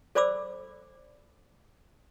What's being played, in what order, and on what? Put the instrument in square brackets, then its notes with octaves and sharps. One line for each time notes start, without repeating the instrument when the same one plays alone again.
[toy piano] A4 C5 D5 B5 D6 E6